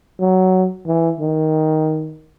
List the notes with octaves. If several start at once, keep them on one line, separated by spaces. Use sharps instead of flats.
F#3
E3
D#3